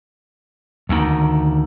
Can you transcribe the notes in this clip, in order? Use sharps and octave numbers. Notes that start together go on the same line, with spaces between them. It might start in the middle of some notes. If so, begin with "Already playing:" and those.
D2 D#3